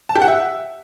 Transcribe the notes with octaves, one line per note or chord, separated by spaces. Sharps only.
A5
G4
F#5
E5